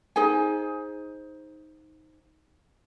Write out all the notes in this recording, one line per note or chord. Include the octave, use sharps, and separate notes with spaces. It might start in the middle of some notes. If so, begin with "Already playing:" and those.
D#4 G#4 C5 G#5